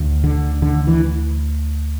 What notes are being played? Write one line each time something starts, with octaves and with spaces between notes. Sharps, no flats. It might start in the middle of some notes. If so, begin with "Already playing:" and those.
Already playing: D2
D3
D3
E3